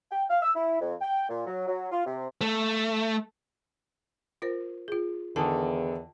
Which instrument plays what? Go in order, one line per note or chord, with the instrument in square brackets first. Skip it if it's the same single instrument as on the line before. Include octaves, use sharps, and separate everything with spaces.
[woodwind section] G5
F5
E6
E4
F2
G5
A#2
F#3
F#3
F4
C3
[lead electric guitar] A3
[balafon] F4 A#4 C5
F4 G#4
[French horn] E2 [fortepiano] D3 D#3 [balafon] G#5